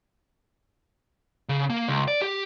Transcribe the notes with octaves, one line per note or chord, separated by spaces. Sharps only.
C#3
A#3
C#2
D5
G4